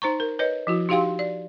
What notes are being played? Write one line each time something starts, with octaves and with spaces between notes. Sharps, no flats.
D#4 C5 A#5 C#6
A#4
B4 C#5 D#5
F3 E4 F#4
D#4 F#4 G4 F5 G5 C6
D5